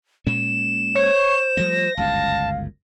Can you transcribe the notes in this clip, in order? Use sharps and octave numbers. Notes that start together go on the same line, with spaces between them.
A#2 G#3 C#4 E7
C5 C#5
F3 G3 A3 A#6
G1 C#2 F#2 F5 A5